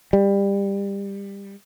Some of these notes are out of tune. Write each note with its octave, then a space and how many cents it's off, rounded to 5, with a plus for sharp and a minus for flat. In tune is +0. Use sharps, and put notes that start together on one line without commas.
G3 +20